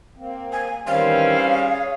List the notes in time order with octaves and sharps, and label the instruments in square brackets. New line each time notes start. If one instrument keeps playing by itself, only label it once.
[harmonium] A#3 C4
[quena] G#5
[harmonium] D#3 E3 [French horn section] G3 C4 C#4 [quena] F5
[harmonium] G#4 C#5